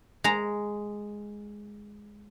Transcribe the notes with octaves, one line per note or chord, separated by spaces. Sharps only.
G#3 A#5